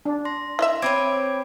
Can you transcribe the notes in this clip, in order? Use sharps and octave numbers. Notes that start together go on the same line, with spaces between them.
D4
C6 A#6
E4 D#5 E5
C4 B4 C#5 D6 G#6 D7